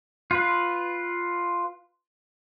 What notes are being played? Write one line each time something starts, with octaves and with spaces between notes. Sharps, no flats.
F4 B4